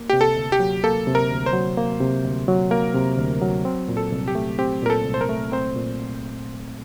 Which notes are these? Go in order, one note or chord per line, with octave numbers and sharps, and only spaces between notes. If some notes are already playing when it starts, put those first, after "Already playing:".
Already playing: A#3
C3 G4
A4
D2
G4
F#3
A#3 A4
C3
A#4
D2
C5
F#3
A#3
C3
D2
F#3
A#3 A#4
C3
D2
F#3
C4
A#2
A4
C2
G4
A3
C4 G4
A#2 A#4
A4
C2
C5
A#4
A3
C4 C5
A#2